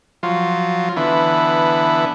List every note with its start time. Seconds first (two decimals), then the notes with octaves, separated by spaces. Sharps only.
0.23 F3 F#3 F4
0.97 D3 E3 B3 E4